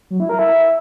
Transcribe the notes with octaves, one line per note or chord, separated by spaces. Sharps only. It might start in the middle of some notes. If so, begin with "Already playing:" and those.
F#3
E4
A#4
E4